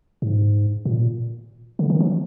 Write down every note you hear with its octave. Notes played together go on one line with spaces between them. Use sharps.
G#2
A#2
D3
D#3
F3